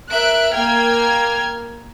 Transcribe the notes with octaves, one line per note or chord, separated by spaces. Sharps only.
A#4 E5 F#6 D7
A#3 G5 F6 G#6